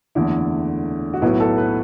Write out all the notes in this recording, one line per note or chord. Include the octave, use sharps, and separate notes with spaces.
F#1 E2 D3 A3 E4
F#4
B1 A2 F#3 B3 E4
A4
B4